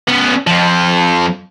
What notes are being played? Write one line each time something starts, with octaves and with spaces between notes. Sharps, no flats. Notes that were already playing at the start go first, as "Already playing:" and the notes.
B3 C#4
F2 F3